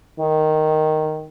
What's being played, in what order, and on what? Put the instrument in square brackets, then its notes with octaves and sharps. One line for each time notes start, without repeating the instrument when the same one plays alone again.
[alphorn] D#3